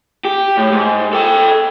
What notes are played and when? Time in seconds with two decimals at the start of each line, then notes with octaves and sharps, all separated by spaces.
0.25 G4
0.57 A2
0.72 G#2
1.13 A4 G5